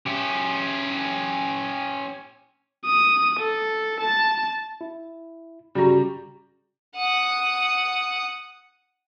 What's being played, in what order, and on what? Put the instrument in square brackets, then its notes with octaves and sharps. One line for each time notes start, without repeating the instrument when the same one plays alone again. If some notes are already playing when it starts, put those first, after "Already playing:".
[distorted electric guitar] C#4 G4
[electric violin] D#6
A4
A5
[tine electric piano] E4
[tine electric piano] G1 C#3 [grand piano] G3 A#5 [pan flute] F#4
[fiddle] F#5 D#6